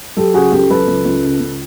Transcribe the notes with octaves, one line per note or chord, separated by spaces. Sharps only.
F#3 G4 A4
C#3 F#4 G#4
C#2 G4 A4
F#3 A4 B4
C#2
C#2
C#3
C#2